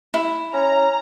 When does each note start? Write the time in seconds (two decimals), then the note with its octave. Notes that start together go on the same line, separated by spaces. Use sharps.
0.14 E4
0.53 C#4 A#5